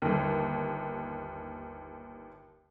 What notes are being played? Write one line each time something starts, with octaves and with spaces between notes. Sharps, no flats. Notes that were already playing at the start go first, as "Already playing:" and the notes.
G1 D#2